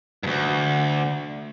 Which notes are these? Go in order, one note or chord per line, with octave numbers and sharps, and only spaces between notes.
D2 G2